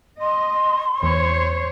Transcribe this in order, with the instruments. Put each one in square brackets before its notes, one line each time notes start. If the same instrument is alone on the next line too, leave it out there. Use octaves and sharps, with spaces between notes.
[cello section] D#5 [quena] C6
[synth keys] E2 [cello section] C5 C#5